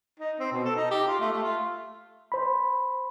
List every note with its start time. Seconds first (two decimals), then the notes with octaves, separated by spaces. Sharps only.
0.20 D#4
0.39 C4
0.52 B2
0.65 A4
0.76 D#4
0.91 G4
1.07 F4
1.20 A3
1.32 A3
1.43 F4
2.32 C5 B5